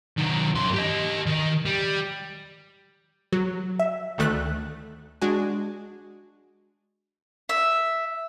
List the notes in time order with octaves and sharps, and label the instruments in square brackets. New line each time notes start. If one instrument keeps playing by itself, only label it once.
[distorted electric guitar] D#3 F#3
F#2 C6
G4 D#5
D#3
G3
[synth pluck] F#3
E5
D2 D#3 A3 F#6
G#3 D4 F#4 G#5
[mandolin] E5